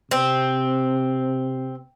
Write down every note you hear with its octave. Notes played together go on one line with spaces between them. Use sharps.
C3 C4